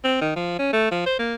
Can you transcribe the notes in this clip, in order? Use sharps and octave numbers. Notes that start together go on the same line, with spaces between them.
C4
D#3
F3
C#4
A3
F3
C5
A#3